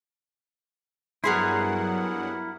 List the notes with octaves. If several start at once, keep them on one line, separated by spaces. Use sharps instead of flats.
G2 F#3 B3 E4 G#4 A#4 F#5 C6